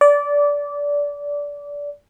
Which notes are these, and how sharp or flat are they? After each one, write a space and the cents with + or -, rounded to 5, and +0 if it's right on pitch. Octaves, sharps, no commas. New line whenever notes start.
D5 -20